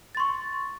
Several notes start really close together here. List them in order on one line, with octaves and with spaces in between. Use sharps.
A6 C6 C#6